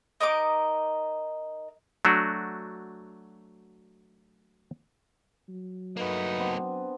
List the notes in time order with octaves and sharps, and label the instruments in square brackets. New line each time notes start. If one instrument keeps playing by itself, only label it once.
[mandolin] D#4 A#4 D#5 D6
[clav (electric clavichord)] F#3 A3 D4 F#4
[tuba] F#3
[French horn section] A3 D#4 B4 [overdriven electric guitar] A#3 F#4
[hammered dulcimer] B3 C4 D4